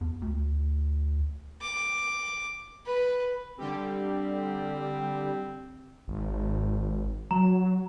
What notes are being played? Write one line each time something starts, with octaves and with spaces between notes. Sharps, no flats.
E2
D2
D6
B4
D3 G3 C4 G4
G#1
F#3 A#5